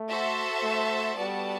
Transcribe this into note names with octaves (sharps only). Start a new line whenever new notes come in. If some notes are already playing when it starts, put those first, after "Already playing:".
Already playing: A3
F#4 A4 C5 E5 A5
A3
G3 B3 F#4 A4 D5 A5